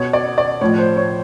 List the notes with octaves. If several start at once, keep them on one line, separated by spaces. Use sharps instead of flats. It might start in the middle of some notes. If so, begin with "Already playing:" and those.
Already playing: B2 C#5
D5
D5
A2 F3 C#5
C5
C#5